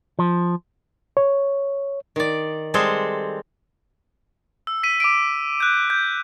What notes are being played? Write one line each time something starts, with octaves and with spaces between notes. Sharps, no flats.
F3
C#5
D#3 D5
G3 G#3 C4 G#4 A4 C5
E6
B6 D#7
D6 B6 D7
F#6 G6
G6